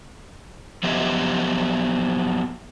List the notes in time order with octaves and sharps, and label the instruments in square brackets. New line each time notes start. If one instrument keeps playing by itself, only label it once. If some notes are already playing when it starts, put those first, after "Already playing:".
[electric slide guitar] F3 F#3 B3 G4 D#5 E5